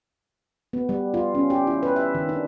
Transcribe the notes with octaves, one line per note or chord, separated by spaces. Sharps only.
B3
G3
F4
C#4
G4
E4
B4
E5
D#3
D4